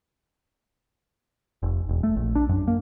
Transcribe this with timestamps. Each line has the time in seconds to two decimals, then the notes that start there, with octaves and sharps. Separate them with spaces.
1.63 F1
1.89 E1
2.03 A3
2.16 A#1
2.35 D4
2.49 F#2
2.68 A#3